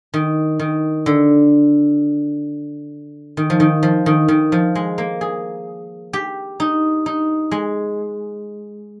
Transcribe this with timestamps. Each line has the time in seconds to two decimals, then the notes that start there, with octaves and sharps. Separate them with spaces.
0.14 D#3
0.59 D#3
1.06 D3
3.37 D#3
3.50 F3
3.60 D#3
3.83 F3
4.06 D#3
4.28 D#3
4.52 F3
4.75 G#3
4.98 A#3
5.21 G#4
6.13 G4
6.60 D#4
7.06 D#4
7.51 G#3